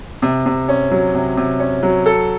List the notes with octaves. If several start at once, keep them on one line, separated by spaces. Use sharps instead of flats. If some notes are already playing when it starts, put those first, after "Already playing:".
C3
C3
C#4
F#3
C3
C3
C#4
F#3
A4